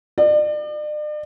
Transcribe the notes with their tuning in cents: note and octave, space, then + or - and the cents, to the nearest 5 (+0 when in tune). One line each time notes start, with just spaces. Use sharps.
D5 +40